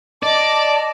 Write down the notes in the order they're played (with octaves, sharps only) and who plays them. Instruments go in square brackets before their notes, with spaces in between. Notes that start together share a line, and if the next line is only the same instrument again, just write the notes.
[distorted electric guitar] D5 [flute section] D#5 A5 [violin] D6